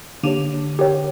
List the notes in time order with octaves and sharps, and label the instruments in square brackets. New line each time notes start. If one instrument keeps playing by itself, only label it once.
[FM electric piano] D3 [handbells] A#3 D4 G4 C#5
[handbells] G4 A#4 C#5 G5